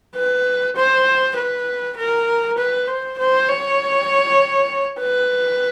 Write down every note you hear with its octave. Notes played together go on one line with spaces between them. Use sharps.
B4
C5
B4
A#4
B4
C5
C5
C#5
B4